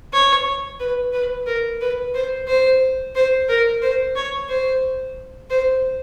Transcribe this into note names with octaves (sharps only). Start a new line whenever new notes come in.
C#5
B4
B4
A#4
B4
C5
C5
C5
A#4
C5
C#5
C5
C5